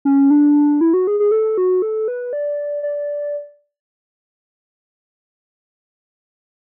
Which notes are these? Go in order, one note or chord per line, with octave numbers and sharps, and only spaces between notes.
C#4
D4
E4
F#4
G#4
G#4
A4
F#4
A4
B4
D5
D5